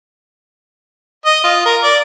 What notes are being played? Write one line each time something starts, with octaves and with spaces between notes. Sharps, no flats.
D#5
F4
A#4
D5